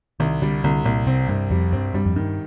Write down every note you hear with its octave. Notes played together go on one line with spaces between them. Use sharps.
C2 D#3
D3 G3
C2 D3
C2 A#2
C3 C4
C2 G2
F2 G3
G2 C4
G2 G3
F2
G2 D#3